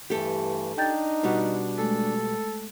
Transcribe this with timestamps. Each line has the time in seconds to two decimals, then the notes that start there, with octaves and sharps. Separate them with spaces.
0.10 G2 E3 A3 G4 A4
0.78 D4 D#4 G5 G6 A6
1.23 B2 G3 F#4
1.78 G#3 A3 A4